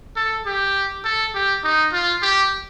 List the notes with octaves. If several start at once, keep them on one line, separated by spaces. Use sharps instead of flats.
A4
G4
A4
G4
D#4
F4
G4